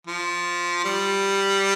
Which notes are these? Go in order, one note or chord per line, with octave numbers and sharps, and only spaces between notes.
F3
G3